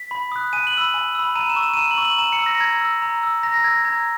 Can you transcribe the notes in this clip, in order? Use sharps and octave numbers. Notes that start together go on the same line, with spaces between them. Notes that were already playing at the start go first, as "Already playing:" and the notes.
Already playing: B6
B5
D#6 F#6
G#5 D#7
F#7
B5 E6
G#5
B5 E6
A#5 D#7
E7
C#6 E6
E7
D#7
A#5 E7
F#7
C#6 E6
F#7
A#5 E7
C#7
E6
A#6
A#5 G#6
E6
A#5
E6
A#5 A#6
A#6
E6 G#6
A#6
A#5 G#6